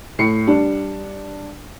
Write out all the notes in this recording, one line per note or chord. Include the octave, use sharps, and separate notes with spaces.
A2 C7 C#7
G3 D4